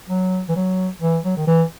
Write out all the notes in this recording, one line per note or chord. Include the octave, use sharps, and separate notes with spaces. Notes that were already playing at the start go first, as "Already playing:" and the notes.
F#3
E3
F#3
E3
F#3
D#3
E3